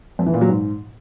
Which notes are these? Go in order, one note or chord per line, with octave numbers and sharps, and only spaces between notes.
F2
E3
A#2
F#3
G#2